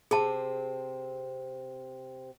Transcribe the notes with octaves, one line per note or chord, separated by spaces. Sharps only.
C3 C4 G#4 A5